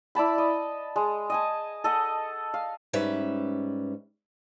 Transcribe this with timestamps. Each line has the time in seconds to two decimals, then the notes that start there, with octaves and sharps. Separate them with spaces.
0.15 E4 D5 A5 B5
0.38 D#5
0.96 G#3
1.30 D#5 G#5 A5
1.84 A4 D#5 F#5
2.54 F5
2.93 G#2 G3 C#4 B4 E5